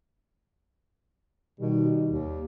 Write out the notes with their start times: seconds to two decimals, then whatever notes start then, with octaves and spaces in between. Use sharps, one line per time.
1.60 B2 D#3 G3
2.09 D#2